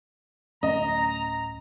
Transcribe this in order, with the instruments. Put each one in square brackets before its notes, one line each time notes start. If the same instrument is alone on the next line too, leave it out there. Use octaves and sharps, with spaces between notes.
[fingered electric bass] D1 A3 C#4 [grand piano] D#5 [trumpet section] A#5